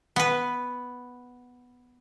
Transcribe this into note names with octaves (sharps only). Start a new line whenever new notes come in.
B3 B4